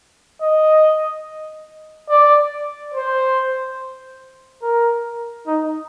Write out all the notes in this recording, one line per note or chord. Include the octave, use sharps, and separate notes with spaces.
D#5
D5
C5
A#4
D#4